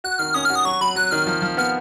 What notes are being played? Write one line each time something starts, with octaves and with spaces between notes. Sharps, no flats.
F#4 F#6
D#3 F6
C#4 D#6
F#4 F6
D#6
F#3 C#6
F#3 B5
F#3 F#6
D#3 F6
F3
F3
B3 F6